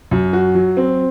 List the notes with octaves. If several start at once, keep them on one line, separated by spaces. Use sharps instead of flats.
F#2
F#4
F#3
C4